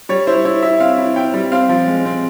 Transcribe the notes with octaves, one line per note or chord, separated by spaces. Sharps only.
G3 C#5
E4 C5
E4 C#5
E4 E5
C4 F5
E4
E4 G5
G3
C4 F5
F3
G#3
C4